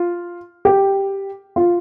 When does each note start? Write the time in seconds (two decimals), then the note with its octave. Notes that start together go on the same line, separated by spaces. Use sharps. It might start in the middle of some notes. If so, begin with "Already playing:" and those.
Already playing: F4
0.65 G4
1.56 F4